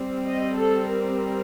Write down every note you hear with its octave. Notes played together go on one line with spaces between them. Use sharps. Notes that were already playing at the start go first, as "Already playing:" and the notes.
Already playing: G3 C4
D#5
A4
A#4